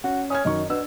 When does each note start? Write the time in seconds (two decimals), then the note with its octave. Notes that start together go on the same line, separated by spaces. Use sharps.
0.04 C#4 F#4
0.30 C#4 D#6 F6 G#6
0.45 F#2 D#3 D#4 C#6
0.70 B2 D4 E6